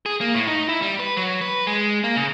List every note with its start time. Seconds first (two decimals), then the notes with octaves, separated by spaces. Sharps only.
0.06 G#4
0.21 A#3
0.34 A2
0.47 D#4
0.69 E4
0.82 G3
1.00 B4
1.17 F#3
1.41 B4
1.67 G#3
2.04 A#3
2.16 C#3